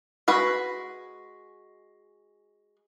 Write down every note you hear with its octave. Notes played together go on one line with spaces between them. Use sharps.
G#3 F#4 B4